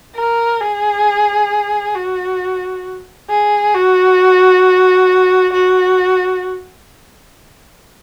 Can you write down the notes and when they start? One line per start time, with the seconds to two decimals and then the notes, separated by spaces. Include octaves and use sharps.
0.16 A#4
0.61 G#4
1.95 F#4
3.30 G#4
3.75 F#4
5.53 F#4